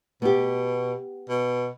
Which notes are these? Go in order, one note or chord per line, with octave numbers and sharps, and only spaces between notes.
B2 B3 G4
B2